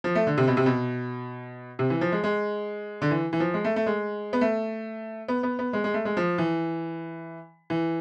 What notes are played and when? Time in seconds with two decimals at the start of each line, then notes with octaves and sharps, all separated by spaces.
0.04 F3
0.15 A3
0.27 D3
0.38 C3
0.48 B2
0.57 C3
0.66 B2
1.79 C3
1.90 E3
2.01 F3
2.12 G#3
2.24 G#3
3.02 D3
3.11 E3
3.33 E3
3.40 F3
3.54 G#3
3.64 A3
3.76 A3
3.86 G#3
4.33 B3
4.41 A3
5.28 B3
5.43 B3
5.59 B3
5.73 G#3
5.84 G#3
5.94 A3
6.05 G#3
6.17 F3
6.38 E3
7.70 E3